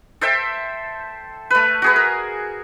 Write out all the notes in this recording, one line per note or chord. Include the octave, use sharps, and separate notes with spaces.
A4 C5 E5 G5
A3 B4
F#4 G#4 B4
A#4